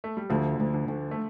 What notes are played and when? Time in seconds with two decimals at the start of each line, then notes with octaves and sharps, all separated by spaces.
0.04 A3
0.17 G3
0.30 D2 D3 F3
0.60 D2
0.74 D3
0.88 D2
1.11 A3